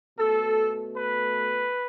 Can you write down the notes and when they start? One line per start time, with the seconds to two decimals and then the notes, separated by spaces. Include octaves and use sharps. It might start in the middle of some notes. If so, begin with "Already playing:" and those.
0.18 B2 A3 A4
0.95 B4